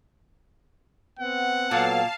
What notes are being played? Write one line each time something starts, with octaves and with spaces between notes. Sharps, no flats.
B3 C4 F#5
A#2 F#3 B3 A4 F5 A5